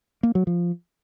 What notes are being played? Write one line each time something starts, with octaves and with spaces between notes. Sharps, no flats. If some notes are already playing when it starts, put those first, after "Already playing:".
A#3
F#3
F3